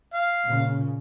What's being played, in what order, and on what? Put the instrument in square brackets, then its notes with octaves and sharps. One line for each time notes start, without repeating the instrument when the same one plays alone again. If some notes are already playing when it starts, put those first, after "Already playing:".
[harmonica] F5
[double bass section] A#2 C#3